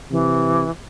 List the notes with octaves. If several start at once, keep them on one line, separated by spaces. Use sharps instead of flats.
C3 E3